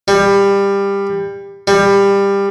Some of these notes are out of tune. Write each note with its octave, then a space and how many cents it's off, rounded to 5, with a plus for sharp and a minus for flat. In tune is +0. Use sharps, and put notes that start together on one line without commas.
G3 +20
G3 +20